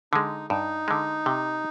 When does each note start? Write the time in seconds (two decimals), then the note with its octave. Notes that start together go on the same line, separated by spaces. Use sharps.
0.13 D3 G#3 D#4
0.50 G2 D#4
0.88 D3 G#3
1.26 C3